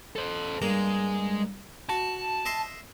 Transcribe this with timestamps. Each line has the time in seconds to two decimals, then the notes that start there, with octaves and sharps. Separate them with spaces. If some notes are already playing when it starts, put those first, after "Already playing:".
0.16 A4 C5
0.62 G2 G#3 A#3
1.89 F#4 A5
2.46 D#5 E5 C6